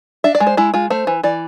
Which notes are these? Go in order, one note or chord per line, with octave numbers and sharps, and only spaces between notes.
D4 E5
D5
G#3
C5
G#3 E4
G#3 F4
A3 C5
E3
E3 D5